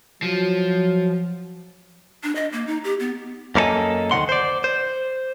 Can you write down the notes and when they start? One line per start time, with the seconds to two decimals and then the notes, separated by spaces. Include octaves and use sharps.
0.22 F3 F#3
2.23 D4
2.35 D#5
2.53 A#3
2.67 D#4
2.84 G4
3.00 B3
3.55 F#2 A#3 E4 A4 D#5 G#5
4.11 D2 D#3 E3 C#4 F#5 C6
4.29 C5 D5
4.64 C5